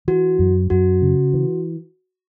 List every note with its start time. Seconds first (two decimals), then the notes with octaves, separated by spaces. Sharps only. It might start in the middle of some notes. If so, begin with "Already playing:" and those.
0.08 E3 F#4
0.39 F#2
0.70 F#2 F#4
1.02 C#3
1.34 E3